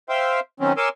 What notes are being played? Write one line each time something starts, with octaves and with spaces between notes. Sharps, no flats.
C5 E5 F5 G5 C6
D#3 F#3 C4 C#4
A#4 C#5 G#5 C6 D6 E6